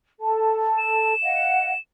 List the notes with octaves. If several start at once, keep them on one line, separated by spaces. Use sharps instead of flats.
A4 A5
E7
D#5 F5 F#5